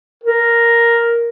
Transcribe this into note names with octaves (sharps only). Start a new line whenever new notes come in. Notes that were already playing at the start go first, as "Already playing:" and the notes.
A#4